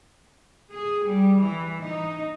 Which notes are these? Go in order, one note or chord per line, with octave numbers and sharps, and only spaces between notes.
G#4
G3
E3
D#4